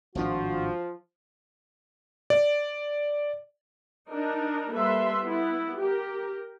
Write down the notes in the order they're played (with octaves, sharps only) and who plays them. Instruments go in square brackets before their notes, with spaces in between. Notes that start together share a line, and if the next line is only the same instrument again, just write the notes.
[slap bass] G#1 A2 D4 [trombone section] F3 [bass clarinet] F#4
[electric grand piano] D5
[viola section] D4 D#4 A#4
G3 A#3 A4 B4 E5 C6
B3 E4
G4 A#4